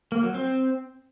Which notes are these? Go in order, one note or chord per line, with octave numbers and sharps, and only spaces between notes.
A#3
F#3
C4